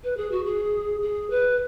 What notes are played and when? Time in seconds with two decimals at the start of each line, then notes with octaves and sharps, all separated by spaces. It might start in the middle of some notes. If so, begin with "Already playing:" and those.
0.04 B4
0.17 G#4
0.31 F#4
0.45 G#4
1.02 G#4
1.30 B4